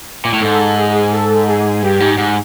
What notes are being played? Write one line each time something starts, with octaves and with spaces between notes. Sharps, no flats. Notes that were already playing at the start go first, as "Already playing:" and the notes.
A#2
A2
G#2 A4
G#4
A4
G#4
G2 G4
G#2
G#2